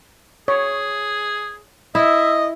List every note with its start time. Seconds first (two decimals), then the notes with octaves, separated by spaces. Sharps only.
0.48 G#4 C#5
1.95 E4 D#5 E5